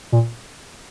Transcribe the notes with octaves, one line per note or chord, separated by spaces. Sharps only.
A#2